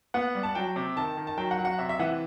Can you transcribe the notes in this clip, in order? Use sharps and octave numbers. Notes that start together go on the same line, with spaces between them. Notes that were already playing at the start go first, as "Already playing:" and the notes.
B3 F#5
G3
A5
F#3 G5
C3
D#3 A5
D#3
A5
F#3 G5
F#5
F#3
F#5
C3 E5
E5
E3 F#5